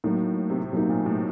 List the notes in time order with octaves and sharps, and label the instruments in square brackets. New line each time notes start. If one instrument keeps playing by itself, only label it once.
[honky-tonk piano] A2 [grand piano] F#3 A#3 D#4
[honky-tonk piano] C3
[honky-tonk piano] B2 [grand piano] F#3 A#3 D#4
[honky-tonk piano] A#2
A2